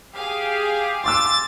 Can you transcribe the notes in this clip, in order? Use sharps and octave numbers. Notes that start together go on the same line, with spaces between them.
G4 G#4 F5
C6 D6 E6 A6